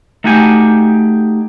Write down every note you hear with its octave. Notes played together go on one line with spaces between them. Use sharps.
A3 D#4 F#4 G4 G#5